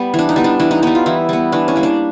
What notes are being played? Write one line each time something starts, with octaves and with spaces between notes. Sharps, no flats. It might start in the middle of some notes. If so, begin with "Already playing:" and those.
Already playing: G3 B3
E3
D4
D#4
G3 B3
D4
E3 D4
D#4
G3 B3 D#4
F4
E3 E4
G3 B3
E3 D4
C#4
G3 A#3
D4